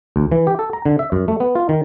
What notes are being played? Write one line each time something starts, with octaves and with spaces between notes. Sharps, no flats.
D2
E3
G4
A4
A#5
D3
E5
F#2
A3
B3
F4
D#3